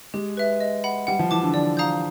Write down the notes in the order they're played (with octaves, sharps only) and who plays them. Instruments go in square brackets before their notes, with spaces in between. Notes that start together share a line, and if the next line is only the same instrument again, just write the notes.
[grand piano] G#3 [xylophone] G4
[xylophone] B4 E5
D#5
F#5 B5
[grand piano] G3 [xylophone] F#5
[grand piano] F3
[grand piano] E3 [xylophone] A5 D6
[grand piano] D3
[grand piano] D3 [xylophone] D5
[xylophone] F5 A#5 D#6 G6